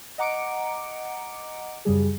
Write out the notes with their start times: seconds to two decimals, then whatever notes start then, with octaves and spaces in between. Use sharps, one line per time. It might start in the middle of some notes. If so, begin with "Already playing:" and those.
0.18 D#5 F#5 A#5 D6 C#7 D7
1.85 F#2 C#3 G3 G#4